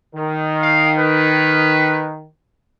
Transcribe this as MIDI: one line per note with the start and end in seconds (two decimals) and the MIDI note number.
0.15 2.26 51
0.62 0.92 77
0.99 2.09 71